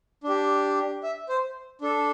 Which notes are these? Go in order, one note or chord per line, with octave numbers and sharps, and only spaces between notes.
D4 G4
E5
C5
D4 A4